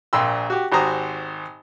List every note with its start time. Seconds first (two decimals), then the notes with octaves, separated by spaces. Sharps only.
0.13 A#1 A#2 G5 C6 E6
0.50 F#4 G4
0.72 G#1 F#4 G4 C5 A#5 D#6